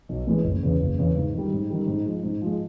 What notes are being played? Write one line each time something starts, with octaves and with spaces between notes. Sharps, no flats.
B1
A2 E3 G#3
F#1
E2 C#3
F#1
E2 C#3
G#2
D#3 G3
G#2
D#3 G3
G#2
F3 G#3
G#2
F3 G#3